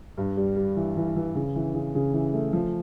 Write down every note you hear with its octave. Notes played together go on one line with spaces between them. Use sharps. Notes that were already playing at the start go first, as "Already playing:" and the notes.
G2
G3
G3
E3
E3
E3
C#3
E3
C#3
C#3
E3
A3
F3